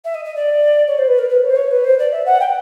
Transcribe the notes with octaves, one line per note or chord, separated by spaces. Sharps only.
E5
D#5
D#5
D5
C#5
C5
B4
A#4
B4
C#5
C5
C#5
B4
C5
D5
E5
F#5
G5